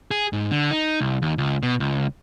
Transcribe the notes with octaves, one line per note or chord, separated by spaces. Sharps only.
G#4
G#2
D3
D#4
C2
D#2
C#2
B2
C#2